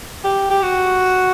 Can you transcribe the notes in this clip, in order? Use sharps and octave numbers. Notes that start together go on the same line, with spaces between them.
G4
G4
F#4